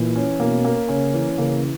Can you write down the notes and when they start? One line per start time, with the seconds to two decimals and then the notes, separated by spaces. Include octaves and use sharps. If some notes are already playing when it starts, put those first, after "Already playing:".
Already playing: A#2 E3
0.16 C#4
0.40 B2 A#3
0.64 A#3
0.88 C#3 C#4
1.14 E3
1.38 C#3 A#3